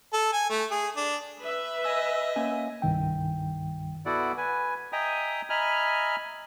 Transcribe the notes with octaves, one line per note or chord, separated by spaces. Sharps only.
A4
G#5
A3
G#4
D4
B4 E5
D#5 G#5 E6
A#3 C#4 G#5
C2 G2 D#3 G5
B3 E4 F#4 A4 D5 F#5
B4 G#5
D#5 E5 G5 G#5 A#5 D#6
D#5 E5 G#5 A#5 B5 F6